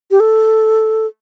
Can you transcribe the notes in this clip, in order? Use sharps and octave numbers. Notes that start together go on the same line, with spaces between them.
G4
A4